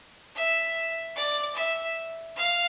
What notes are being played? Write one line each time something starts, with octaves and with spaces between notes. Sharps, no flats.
E5
D5
E5
F5